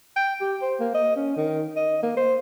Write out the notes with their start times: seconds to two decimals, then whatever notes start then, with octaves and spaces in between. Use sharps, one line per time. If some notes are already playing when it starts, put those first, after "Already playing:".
0.16 G5
0.41 G4
0.62 C5
0.80 A#3
0.94 D#5
1.16 C#4
1.37 D#3
1.77 D#5
2.03 A#3
2.17 C5